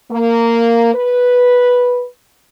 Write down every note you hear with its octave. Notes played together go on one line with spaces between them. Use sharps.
A#3
B4